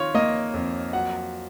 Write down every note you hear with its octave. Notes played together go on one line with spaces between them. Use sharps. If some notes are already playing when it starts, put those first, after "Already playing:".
Already playing: D#3 F4 C#5
A#3 D#5
F2
F#3 F#5